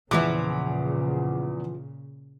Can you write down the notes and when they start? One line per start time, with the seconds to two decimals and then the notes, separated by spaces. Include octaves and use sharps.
0.11 E2 A#2 C#3 E3 F3 E4 D6